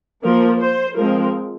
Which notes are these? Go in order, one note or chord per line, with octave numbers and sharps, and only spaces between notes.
F3 A#3 A#4
C5
F3 G#3 C4 A#4